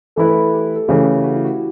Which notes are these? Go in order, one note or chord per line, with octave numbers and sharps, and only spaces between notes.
E3 A3 E4 A4 B4
G4
A4
C#3 E3 A3 G4
F#4
E4
F#4